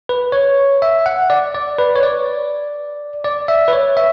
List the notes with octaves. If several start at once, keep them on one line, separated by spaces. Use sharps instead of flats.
B4
C#5
E5
F#5
D5
D5
B4
C#5
D5
D5
E5
B4
C#5
E5